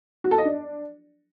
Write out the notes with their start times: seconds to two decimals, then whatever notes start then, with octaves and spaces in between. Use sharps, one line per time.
0.24 F#4
0.31 A4
0.38 D#5
0.45 D4